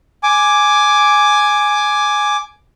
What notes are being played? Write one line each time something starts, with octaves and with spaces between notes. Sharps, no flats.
G#5 D6